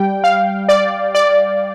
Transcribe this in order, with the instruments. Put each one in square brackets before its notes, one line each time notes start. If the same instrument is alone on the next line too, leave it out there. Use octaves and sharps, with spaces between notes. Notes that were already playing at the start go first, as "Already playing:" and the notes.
Already playing: [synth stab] G3 G5
F5
D5
D5